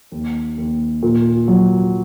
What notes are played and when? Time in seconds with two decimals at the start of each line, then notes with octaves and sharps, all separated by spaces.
0.12 D#2
0.58 D#2
1.03 A#2
1.48 F#3